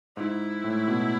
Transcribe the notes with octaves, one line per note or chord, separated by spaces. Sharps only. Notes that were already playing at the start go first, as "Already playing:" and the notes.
G#2 E4
A2
B2